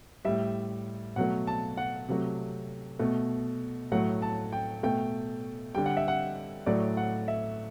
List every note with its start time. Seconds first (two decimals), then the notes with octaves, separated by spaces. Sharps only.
0.25 A2 G3 E5
1.16 B2 F#3 A3 F#5
1.47 A5
1.77 F#5
2.08 C3 F#3 A3
2.99 B2 A3
3.91 A2 F#3 A3 F#5
4.22 A5
4.52 G5
4.83 B2 A3 G5
5.75 D3 G3 G5
5.86 F#5
5.97 E5
6.08 F#5
6.66 A2 F#3 A3 D5
6.97 F#5
7.28 E5